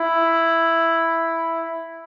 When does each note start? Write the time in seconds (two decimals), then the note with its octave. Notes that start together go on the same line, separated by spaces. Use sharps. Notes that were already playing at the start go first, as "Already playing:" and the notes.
Already playing: E4